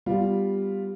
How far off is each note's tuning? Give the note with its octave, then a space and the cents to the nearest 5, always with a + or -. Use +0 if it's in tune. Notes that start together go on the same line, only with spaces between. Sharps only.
G3 +0 B3 +0 F4 +0